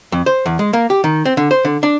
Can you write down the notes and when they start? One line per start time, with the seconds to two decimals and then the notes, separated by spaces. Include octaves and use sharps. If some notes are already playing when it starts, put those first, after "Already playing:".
0.12 F2
0.26 C5
0.46 E2
0.59 G#3
0.73 A#3
0.90 G4
1.04 D#3
1.25 C4
1.37 D3
1.51 C5
1.65 D3
1.83 D4